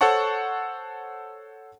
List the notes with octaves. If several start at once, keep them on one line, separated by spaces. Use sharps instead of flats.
A4 C5 C#5 F#5 A5 C#6